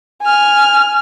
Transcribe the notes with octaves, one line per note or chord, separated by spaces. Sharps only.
G#5 F6